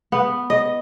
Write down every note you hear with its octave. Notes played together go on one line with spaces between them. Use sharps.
B3
D#5